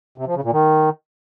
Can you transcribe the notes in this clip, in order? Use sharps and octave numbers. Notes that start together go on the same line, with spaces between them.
C3
F3
C#3
A#2
D#3